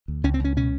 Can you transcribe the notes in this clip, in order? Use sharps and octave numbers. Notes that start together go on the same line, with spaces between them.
D2
C#2 C#4
C4
C#2 C#4
B2 C#4